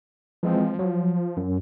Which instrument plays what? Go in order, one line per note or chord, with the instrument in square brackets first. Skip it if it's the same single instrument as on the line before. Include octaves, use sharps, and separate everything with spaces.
[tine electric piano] E3 G#3 C4 [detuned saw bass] F3
[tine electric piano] F#3
F#2